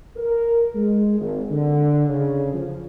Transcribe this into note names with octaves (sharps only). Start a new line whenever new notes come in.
A#4
G#3
G#1
D3
C#3
F3